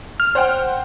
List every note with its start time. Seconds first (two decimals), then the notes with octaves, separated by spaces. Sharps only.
0.20 F6
0.35 C5 F#5 G5